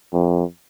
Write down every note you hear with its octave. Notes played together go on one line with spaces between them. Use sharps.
F2